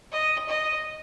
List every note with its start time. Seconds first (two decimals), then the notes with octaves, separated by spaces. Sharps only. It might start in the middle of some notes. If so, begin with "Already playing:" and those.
0.12 D#5
0.48 D#5